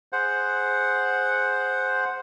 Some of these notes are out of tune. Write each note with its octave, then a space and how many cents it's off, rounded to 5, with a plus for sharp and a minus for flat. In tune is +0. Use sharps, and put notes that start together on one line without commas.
G#4 +0 C5 +0 F#5 -5